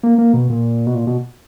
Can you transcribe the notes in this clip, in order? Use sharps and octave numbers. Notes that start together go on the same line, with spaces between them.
A#3
A#3
B2
A#2
B2
A#2
B2